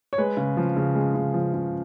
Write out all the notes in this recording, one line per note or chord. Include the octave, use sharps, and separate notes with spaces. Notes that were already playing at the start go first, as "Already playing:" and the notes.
C#5
G#3 B4
C#3
F3
C#3
G#3
C#3
F3
C#3